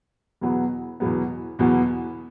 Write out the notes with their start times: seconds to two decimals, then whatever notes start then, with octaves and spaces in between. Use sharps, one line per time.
0.41 E2 B2 F#3 B3
1.00 E2 B2 F#3 B3
1.59 E2 B2 F#3 B3